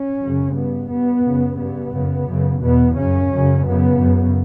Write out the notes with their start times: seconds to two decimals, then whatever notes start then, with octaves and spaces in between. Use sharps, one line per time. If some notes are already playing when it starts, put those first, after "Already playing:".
Already playing: C#4
0.21 F#2 C#3
0.55 G2 B3
0.90 G2 B3
1.24 F#2 C#3
1.59 G2 B3
1.93 F#2 C#3
2.28 F#2 C#3
2.63 E2 B2 B3
2.97 F#2 C#3 C#4
3.31 F#2 C#3
3.66 F#2 C#3 B3
4.00 F#2 C#3